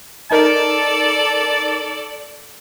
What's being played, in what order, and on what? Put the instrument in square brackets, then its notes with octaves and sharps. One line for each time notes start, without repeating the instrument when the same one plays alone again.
[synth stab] D#4 A#4 [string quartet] A4 D5 [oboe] A5